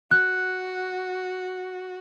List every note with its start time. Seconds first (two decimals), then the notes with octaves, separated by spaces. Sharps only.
0.11 F#4 F#6